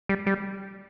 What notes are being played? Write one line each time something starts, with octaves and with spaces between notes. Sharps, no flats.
G3
G3